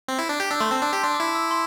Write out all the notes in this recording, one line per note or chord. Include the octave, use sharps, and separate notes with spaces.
C4
E4
D4
G4 G6
D4 E6
A3 C6
C4 A5
D4
G4
D4 C6
D6
E4
E6
C6